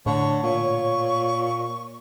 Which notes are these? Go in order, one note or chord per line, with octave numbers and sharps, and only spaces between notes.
A2 D3 C#5 C#6
A#2 C#6